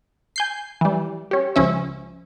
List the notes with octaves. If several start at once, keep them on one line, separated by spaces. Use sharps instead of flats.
G#5 G6 C7
E3 G3
C#4 G4
C#2 F3 C#4 E5